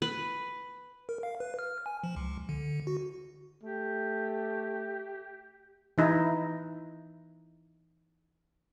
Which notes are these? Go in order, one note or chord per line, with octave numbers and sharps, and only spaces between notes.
B4
A#4
F5
B4
F6
G#5
F3
C#2
D3
F#4
A3 G4
E3 D#4 E4